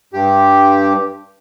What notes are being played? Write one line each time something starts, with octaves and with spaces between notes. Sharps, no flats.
G2 G4